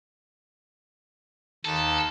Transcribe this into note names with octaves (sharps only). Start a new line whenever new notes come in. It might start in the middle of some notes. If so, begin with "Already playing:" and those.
D#2 A4